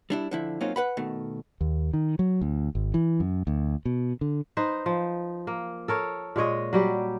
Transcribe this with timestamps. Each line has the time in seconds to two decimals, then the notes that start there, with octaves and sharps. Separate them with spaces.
0.10 G3 D4 E4
0.31 D3 F3 E4
0.61 F#3 A#3 C4 C#4 D#4 F4
0.76 B4 F#5 B5
0.97 B2 D#3 A3
1.61 D#2
1.93 D#3
2.19 F#3
2.41 D2
2.75 G#1
2.94 E3
3.20 F#2
3.47 D2
3.85 B2
4.21 D3
4.57 D#4 B4 C5
4.86 F3
5.47 A#3
5.88 A4 A#4 C#5
6.36 A#2 G#3 C#5 D#5
6.73 F#3 G3 G4